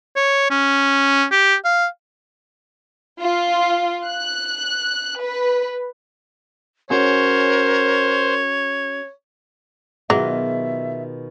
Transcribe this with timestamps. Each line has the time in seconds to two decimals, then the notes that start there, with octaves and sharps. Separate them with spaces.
0.16 C#5
0.50 C#4
1.31 G4
1.65 F5
3.21 F4
4.06 F#6
5.19 B4
6.90 C#4 F#4 G#4 A#4 C5 C#5
10.10 B2 D#3 F#3 F4 G#4 E5